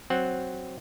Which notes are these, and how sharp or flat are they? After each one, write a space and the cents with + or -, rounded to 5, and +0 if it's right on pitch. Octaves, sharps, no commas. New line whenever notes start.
F#3 +0 C4 +0 F#5 +0